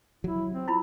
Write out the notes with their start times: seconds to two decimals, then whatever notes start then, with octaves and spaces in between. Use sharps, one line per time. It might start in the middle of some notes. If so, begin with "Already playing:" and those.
0.24 F#3 E4
0.52 C4
0.68 E4 F4 B5